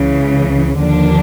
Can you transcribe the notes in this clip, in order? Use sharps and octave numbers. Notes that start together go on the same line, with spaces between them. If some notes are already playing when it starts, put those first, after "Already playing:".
Already playing: C#2 C#3 E3
D#2 D3 F3 A#3 D4